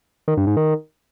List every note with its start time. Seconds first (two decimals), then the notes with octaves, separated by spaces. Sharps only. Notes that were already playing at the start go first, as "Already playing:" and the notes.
0.28 D#3
0.37 G2
0.47 G#2
0.57 D#3